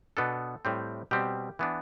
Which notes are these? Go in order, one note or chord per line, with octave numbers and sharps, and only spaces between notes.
B2 B3 D4 A4
A2 G3 C4
B2 G3 C4 G4
E3 B3 D4